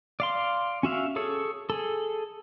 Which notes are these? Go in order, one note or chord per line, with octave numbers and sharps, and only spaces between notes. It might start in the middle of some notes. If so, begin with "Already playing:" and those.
D5 F5 C6
C#4 F#4 E5 F5
G#4 A4 C#5
G#4 A4